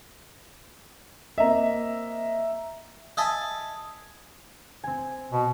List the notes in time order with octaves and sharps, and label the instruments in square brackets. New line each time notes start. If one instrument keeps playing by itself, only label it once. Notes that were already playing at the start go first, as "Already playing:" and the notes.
[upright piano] A#3 C4 D#5 [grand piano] E5 A#5
[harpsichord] D#5 E5 G#5 A5
[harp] C4 G#5
[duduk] B2